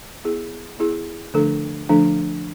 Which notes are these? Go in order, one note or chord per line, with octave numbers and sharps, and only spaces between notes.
B3 E4 G#4
B3 E4 G#4
D3 F3 A3 D4 A4
D3 F3 A3 D4 A4